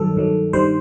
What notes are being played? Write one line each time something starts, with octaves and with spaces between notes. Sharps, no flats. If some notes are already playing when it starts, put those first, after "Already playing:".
Already playing: G2 D#3 F#3 A4
G2 D#3 F#3
G2 D#3 G3 C5